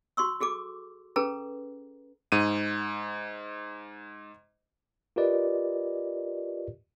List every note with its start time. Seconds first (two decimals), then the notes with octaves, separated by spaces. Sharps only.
0.17 F#4 C6 C#6 E6
0.40 F#4 G#4 A4 D6
1.16 C#4 G#4 A4 B4 A#5
2.32 G#2 D#7
5.16 F4 G4 A#4 B4 D5 D#5